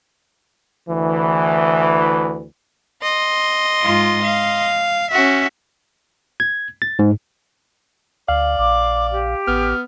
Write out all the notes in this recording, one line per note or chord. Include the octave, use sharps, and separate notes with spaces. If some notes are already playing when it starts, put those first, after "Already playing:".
D2 E3
D#5 C6
G#2 F4
F5
C#4 F#4 E5
G#6
A6
G#2
D2 D5 F5
A#1 D6
G4
A1 B3 F6